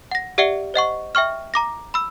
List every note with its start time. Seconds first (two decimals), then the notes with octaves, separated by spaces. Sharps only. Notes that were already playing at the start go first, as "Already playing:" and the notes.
0.11 F#5 A#6
0.38 G4 D5 E5 F#5 C#7 G7
0.74 C5 D#5 F#5 C#6
1.15 E5 G5 C#6 F6
1.54 A#5 D6 A#6
1.94 B5 E6